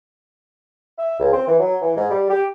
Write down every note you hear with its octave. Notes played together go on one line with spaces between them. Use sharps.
E5
C#2
C4
E3
F#3
E3
G#2
G3
G4